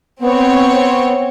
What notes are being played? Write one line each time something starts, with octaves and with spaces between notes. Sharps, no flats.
B3 C4 C#5